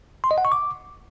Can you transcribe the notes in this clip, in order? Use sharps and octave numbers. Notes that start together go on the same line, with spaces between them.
C6
D#5
F#5
C#6
D6